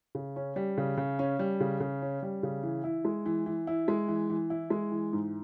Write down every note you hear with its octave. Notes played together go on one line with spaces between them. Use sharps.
C#3
C#4
G3
C#3
C#3
C#4
G3
C#3
C#3
C#4
G3
C#3
E3
E4
G#3
E3
E3
E4
G#3
E3
E3
E4
G#3
E3
G#2